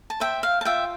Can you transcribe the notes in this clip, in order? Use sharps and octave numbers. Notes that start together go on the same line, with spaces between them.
A5
C5 E5 G5
F5
A5
F4 E5 G5